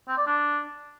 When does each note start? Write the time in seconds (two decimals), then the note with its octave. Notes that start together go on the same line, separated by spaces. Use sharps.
0.08 C4
0.17 D5
0.27 D4